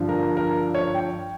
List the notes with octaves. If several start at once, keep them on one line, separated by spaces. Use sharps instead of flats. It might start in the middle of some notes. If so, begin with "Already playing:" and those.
Already playing: G2 D3 F3
A#4
A#4
C#5
G5